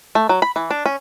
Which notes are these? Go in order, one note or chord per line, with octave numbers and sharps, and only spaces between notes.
A3
F#3
B5
E3
D4
C#4